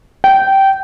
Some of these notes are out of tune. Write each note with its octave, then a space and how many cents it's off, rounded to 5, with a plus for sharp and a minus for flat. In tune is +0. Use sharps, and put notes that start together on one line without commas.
G5 -15